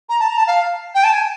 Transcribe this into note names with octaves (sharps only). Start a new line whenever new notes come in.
A#5
A5
A#5
A5
F5
G5
A5
G#5